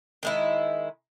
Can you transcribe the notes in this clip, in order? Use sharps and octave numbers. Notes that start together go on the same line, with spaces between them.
D#3 G#3 E4